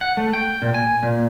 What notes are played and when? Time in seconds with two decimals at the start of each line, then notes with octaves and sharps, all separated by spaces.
0.01 F#5
0.17 A3
0.33 G5
0.62 A#2
0.74 G#5
1.03 A#2